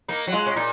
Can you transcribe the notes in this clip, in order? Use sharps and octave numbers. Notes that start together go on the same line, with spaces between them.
A#3 D#4
F#3
G#3 F4
C#4
A#2 D#4